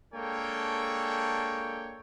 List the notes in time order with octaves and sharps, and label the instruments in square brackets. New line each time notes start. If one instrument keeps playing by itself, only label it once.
[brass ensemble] G#3 A#3 D4 A4 C#5 G5